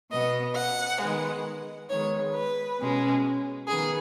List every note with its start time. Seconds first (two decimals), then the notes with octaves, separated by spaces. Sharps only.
0.11 B2 B3 D#5
0.56 F#5
1.01 D#3 G#3 B3
1.89 D#3 G#3 B3 C#5
2.35 B4
2.79 B2 G#3 C#4
3.68 D#3 B3 G#4